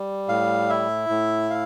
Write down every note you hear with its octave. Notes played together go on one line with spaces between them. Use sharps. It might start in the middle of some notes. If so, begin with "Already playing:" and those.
Already playing: G3
A2 F5
E4 E5
A2
F5